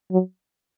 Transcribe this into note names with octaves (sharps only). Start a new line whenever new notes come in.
F#3